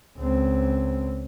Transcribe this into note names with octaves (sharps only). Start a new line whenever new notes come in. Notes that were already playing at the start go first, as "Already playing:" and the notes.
C#2 C4